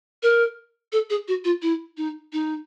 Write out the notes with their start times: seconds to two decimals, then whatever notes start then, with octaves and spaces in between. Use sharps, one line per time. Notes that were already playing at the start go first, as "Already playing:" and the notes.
0.23 A#4
0.92 A4
1.10 G#4
1.28 F#4
1.45 F4
1.62 E4
1.97 D#4
2.33 D#4